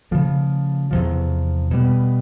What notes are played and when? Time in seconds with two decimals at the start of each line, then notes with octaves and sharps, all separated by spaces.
0.11 C#3 F3 A3
0.91 E2 C3 F3
1.71 B2 G3 B3